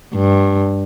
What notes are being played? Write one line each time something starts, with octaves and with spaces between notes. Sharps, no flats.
G2